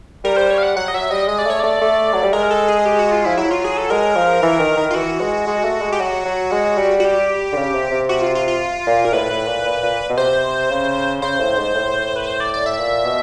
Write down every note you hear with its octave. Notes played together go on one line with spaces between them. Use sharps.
G3 A#4
C5
C#5
F5
F#5
F#3 F#5
D#5
F#3 E5
G3 D#5
G#3 D#5
D5
A3 C#5
A3 D5
A3
F#3
G3
G#3 A#4
A4
G#4
G4
F#4
F4
F3 E4
F#3 E4
F4
G#4
A4
G#3 A#4
F3
E3
D#3
D#3
F4
E3 F#4
G#3
G#3
A3
G#3
G4
F#3 F#4
F#3
G#3
G3
F#4
G4
D3
C#3
C3
C3
F#4
F4
F4
F4
A#2
A#4
A2 B4
A2
A#2
A#2
A#2
B2
C3 C5
C#3
C#3 C5
A2
G#2
A2
B4
C5
D5
D5
E5
A#2
B2